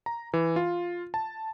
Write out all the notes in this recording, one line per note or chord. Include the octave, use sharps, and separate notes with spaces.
A#5
E3
F4
A5